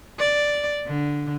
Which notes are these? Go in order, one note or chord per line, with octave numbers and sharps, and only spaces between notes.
D5
D3